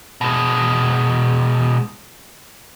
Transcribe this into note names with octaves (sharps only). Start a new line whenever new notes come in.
B2 G#3